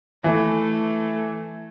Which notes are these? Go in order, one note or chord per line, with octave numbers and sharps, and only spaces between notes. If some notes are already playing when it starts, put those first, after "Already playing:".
E3 A3